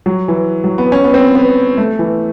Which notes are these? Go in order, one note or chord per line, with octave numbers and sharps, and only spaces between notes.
F#3
E3
F#3
B3
C#4
B3
C4
B3
A3
E3